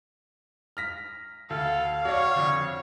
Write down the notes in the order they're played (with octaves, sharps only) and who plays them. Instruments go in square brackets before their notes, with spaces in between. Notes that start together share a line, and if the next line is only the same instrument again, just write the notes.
[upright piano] F6 A#6 B6
[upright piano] D2 [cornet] A4 [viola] F5
[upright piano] F#4 D5 [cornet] C#5
[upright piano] F2 D3